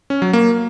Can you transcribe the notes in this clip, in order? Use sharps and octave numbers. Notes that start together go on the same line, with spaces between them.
C#4
F#3
A#3